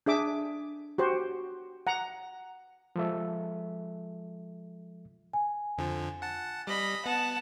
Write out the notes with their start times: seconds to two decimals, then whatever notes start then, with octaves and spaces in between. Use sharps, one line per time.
0.06 D4 G#4 E5 D6
0.98 F#4 G4 C5
1.87 F#5 A#5
2.96 F3 G#3 A4 E5
5.33 G#5
5.78 F2 D3 F3
6.22 F#5 A5
6.67 G3 D#5 B5
7.06 B3 F#5 A5